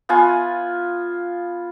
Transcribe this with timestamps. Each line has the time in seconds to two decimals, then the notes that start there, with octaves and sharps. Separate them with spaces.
0.09 B3 F4 G#5